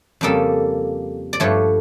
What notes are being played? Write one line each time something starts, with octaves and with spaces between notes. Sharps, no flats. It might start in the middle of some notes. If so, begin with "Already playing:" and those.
F2 C#3 G3 A#3 A4
D5
G2 F3 A3 C#5